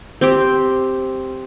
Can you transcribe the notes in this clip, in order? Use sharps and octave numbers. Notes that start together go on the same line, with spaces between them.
C4 G4